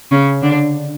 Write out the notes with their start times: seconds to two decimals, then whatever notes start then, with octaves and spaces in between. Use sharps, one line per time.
0.11 C#3 C#4
0.42 D3 D4